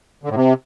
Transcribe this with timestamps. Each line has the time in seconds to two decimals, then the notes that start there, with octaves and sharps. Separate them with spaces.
0.23 D3
0.29 A2
0.36 C3